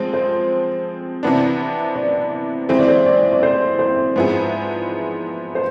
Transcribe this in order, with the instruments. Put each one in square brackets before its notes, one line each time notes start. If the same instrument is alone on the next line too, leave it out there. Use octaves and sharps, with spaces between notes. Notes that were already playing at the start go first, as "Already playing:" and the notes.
Already playing: [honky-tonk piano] F3 G#3 C4 [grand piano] C5
[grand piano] C5
[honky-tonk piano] C3 E3 B3 D4
[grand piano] D5
[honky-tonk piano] E3 G#3 C4 [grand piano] C5
[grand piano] D5
C5
D5
D5
C5
C5
[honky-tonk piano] G#2 F3 B3 E4 G#4
[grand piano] C5